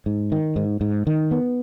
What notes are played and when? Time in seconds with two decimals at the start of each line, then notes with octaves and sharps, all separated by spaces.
0.06 G#2
0.32 D#3
0.56 G#2
0.81 G#2
1.07 D#3
1.31 B3